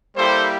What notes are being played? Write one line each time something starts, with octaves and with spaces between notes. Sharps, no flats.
G3 A#3 E4 G4 A4 C5